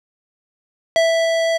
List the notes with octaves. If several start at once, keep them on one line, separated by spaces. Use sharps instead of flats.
E5